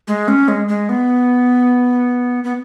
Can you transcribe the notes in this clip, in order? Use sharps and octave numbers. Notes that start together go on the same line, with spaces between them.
G#3
C#4
G#3
G#3
B3
B3